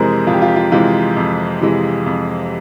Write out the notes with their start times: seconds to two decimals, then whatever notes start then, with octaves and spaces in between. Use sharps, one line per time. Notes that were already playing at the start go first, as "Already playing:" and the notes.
Already playing: F2 C3 E3 G#3 A#4 C5
0.27 F2 F4
0.34 G4
0.42 F4
0.48 G4
0.56 F4
0.72 C3 E3 G#3 F4
1.17 F2
1.61 C3 E3 G#3
2.06 F2